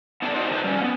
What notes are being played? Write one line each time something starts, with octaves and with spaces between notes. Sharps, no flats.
B3 D4 A4 D5 G#5 A5
D4 D#4 F#4 C5
D#3 D#4 G4 G#4 B4 C5
G3 C#4
A#3 B3